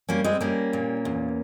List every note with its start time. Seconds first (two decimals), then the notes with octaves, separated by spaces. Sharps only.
0.09 G3 A#3 C#4
0.24 G#3 C4
0.41 G3 A#3 C#4
0.73 A#2
1.05 E2